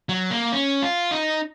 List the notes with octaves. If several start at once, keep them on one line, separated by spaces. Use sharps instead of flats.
F#3
A#3
C#4
F4
D#4